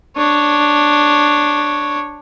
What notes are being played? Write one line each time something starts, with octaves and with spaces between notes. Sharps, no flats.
D4 C#5